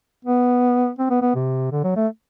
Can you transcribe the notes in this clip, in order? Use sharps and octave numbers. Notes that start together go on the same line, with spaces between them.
B3
C4
B3
B3
C3
D3
F#3
A3